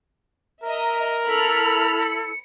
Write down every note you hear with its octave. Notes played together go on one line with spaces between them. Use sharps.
A#4 D#5 E5 A#5
E4 A4 B5 F6
C#7